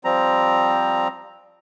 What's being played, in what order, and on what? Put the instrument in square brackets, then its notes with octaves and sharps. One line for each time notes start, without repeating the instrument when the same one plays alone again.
[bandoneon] F3 G3 C4 A#5